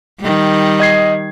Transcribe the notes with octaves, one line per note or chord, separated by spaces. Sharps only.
D#3 G3
D#5 G#6 C7